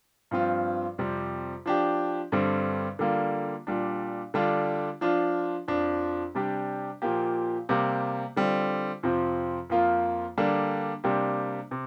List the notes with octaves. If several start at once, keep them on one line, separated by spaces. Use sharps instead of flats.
G2 F3 C4 F4
F2 C3 G3
F3 D4 G4
G2 D3 G3 C4
D3 G3 A#3 F4
A#2 G3 D4
D3 G3 D4 F4
F3 D4 F4
F2 F3 D4
C3 G3 D4 G4
A#2 F3 A#3 G4
C3 G3 A#3 G4
D3 G3 C4 F4
F2 C3 F3 C4
F2 F3 A#3 F4
D3 G3 A#3 D4
C3 G3 A#3 D4 G4
C3